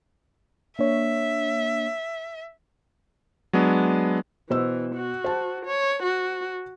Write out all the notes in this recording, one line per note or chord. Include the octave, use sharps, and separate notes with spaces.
A#3 D4 C#5 E5
F#3 G#3 B3 D4
B2 E3 C5 E6
F#4
C5 A5
C#5
F#4